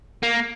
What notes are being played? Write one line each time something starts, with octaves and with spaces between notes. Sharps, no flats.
A#3